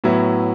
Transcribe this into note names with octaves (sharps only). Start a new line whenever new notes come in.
A2 F#3 B3 E4